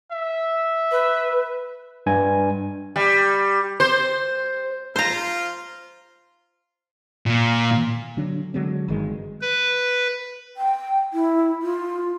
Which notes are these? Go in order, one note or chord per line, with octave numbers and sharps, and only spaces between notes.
E5
B4
G2 G#5
G3
C5
F4 C5 A#5
A#2
D3 F#3 D4
D3 F#3 G#3 C4
G1 D#3 G#3
B4
G5
E4
F4